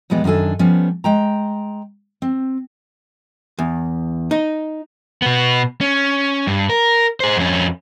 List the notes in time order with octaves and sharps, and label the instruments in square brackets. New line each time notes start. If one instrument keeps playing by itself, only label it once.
[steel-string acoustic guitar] E2 A#2 G3 G#3 B3
F#2 D#3 D4 A4 G#5
F3 G3 B3 C#4
G#3 G5 A#5
C4
[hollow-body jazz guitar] E2
D#4
[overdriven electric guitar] B2 B3
C#4
G2
A#4
G#4 C5
F2 C#4